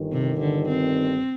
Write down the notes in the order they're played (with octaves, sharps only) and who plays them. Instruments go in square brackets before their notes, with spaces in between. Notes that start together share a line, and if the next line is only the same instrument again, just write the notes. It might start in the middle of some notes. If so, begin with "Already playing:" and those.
Already playing: [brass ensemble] G1 G2 D#3
[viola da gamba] C3
D3
C4